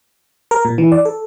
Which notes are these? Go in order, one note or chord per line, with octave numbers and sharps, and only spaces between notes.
A#4
A#2
E3
D5
A4